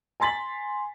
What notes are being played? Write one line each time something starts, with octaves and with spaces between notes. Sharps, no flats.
G#5 A#5 C6 A6 B6 F#7